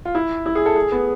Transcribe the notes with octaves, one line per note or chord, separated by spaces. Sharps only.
F4
E4
E4
G#4
A4
G#4
B3